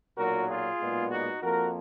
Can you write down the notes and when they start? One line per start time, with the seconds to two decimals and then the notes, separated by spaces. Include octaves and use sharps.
0.16 B1 A#2 F#3 F#4 A#4
0.47 F4 G#4
0.80 B1 A#2 G#3 B3
1.11 D#4 F#4
1.41 F2 F3 A#3 F#4 A#4